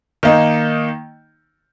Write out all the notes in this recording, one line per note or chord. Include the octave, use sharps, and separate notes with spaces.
D#3 A#3 D#4